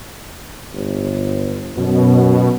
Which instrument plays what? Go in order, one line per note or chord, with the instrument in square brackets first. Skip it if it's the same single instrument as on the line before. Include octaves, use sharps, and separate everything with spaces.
[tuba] G1
[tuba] F#2 [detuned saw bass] B2